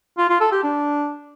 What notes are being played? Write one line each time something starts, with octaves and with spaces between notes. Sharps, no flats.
F4
F4
A4
G4
D4